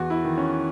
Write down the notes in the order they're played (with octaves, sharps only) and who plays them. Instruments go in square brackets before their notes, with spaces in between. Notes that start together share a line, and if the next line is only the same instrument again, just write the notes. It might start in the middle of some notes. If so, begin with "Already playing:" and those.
Already playing: [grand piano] E2 F#4
E4
D#3
C#4